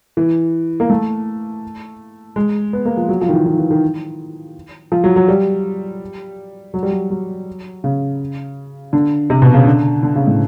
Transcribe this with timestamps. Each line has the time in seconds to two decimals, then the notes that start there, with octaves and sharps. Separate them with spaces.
0.17 E3
0.80 A#3
0.90 A3
2.36 G#3
2.73 B3
2.85 A#3
2.97 F3
3.09 F#3
3.21 F3
3.29 D#3
3.33 E3
3.46 D#3
3.58 E3
3.71 D#3
4.92 F3
5.04 F#3
5.16 F#3
5.28 G3
6.74 F#3
6.83 G3
6.91 F#3
7.10 F#3
7.84 C#3
8.93 D3
9.30 C3
9.42 B2
9.54 C#3
9.66 D3
10.03 D3
10.16 C#3
10.27 A2